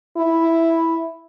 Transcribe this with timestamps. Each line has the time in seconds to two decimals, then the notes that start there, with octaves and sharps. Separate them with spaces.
0.17 E4